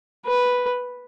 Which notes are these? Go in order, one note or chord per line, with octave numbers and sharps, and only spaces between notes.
B4